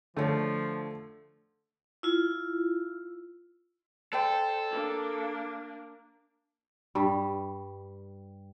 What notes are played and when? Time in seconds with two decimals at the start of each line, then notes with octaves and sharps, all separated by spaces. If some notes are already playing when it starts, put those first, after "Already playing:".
0.17 D3 F3 A3 C#5
2.03 E4 F4
4.13 A4 C5 D5 G5
4.71 A#3 D4
6.95 G2 G3